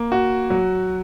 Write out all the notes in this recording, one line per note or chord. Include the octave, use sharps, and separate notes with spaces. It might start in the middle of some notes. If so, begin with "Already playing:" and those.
Already playing: A#3
F#4
F#3